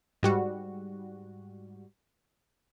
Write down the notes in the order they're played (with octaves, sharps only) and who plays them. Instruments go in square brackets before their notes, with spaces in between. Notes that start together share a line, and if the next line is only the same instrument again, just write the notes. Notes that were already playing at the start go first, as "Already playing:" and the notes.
[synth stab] G#2 G3 F#4